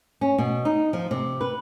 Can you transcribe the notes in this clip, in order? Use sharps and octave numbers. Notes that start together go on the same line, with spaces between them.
C#4
B2
D#4
F3
C3
B4